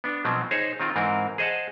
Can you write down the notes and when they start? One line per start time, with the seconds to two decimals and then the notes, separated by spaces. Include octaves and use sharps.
0.04 B3 D4
0.25 B2 F3 F#3 C4
0.51 D#4 G#4 C5 C#5
0.80 D#3 C4 F4
0.96 G#2 E3 C4 A#4
1.38 G#4 C5 D#5 F5 F#5 A5